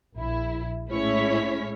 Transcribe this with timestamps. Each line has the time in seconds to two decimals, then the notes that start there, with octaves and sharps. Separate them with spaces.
0.17 A#1 E4
0.90 A2 G#3 C#4 E4 C#5 B6